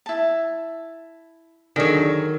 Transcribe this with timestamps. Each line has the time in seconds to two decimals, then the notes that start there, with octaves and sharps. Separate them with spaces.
0.06 E4 A5
1.76 D3 D#3 F#3 D4 G#4 A#4 D5